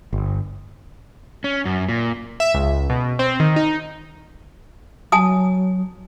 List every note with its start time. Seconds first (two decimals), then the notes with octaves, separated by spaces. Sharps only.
0.13 G1
1.44 C#4
1.65 F#2
1.89 A#2
2.40 E5
2.54 C#2
2.90 B2
3.19 C4
3.40 D#3
3.56 D#4
5.12 F#3 G#5 A5 D#6